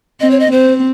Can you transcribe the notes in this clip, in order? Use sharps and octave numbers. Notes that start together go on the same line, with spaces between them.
C4 D#5
C#5
D#5
C4 C5